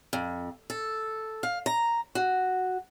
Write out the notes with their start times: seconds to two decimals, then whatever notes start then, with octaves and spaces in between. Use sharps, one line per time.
0.13 F2
0.70 A4
1.43 F5
1.66 A#5
2.15 F#4